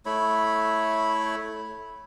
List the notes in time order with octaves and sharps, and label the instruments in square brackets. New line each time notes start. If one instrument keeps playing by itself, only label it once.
[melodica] A3 E4 C#5 B5